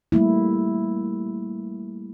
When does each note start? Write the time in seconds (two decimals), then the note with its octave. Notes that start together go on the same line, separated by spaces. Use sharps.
0.12 G3 A3 A#3 E4